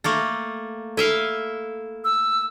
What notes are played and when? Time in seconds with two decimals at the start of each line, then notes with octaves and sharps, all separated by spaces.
0.04 A3 A#3 A4
0.97 E4 A4 E5 F5 D#7 G7
2.04 E6